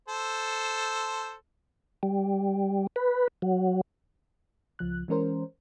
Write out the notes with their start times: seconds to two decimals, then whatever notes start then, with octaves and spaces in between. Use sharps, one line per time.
0.08 A4 C5
2.03 G3
2.96 B4
3.42 F#3
4.79 C#2 F3 F#6
5.08 E3 G#3 C#4 A#4 C5